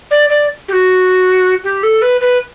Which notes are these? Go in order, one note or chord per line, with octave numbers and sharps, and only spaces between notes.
D5
D5
G4
F#4
G4
A4
B4
B4